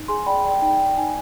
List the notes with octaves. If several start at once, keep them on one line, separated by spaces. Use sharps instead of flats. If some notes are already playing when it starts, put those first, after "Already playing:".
Already playing: D#4
G#4 G#5 C6
D5 G5 B5
D5 G5
D#4 G5
D5
D#4 G#5